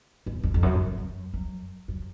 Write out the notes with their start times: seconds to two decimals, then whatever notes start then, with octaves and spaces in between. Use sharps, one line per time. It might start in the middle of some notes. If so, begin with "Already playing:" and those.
0.26 E2
0.43 F2
0.54 F2
0.63 F#2
0.80 F2
0.98 F#2
1.34 F#2
1.88 F#2